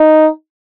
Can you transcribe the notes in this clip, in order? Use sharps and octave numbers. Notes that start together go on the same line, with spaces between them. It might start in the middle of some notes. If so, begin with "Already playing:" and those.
Already playing: D#4